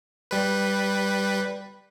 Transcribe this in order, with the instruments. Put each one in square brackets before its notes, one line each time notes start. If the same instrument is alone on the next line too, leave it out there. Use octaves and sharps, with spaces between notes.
[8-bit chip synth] G3 B4